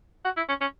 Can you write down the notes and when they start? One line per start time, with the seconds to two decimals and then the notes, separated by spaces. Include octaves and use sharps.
0.25 F#4
0.37 E4
0.49 C#4
0.61 C#4